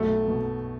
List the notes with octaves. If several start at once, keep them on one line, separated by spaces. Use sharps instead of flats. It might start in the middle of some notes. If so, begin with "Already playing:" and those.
Already playing: B1 A3
B2